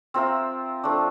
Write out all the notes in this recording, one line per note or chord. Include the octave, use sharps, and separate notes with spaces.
C4 F4 A#4 E5
F3 A3 D4